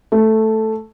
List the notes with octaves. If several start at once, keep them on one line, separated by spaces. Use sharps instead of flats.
A3